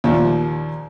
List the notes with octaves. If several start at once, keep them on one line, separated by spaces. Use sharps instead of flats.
D#2 A#2 F3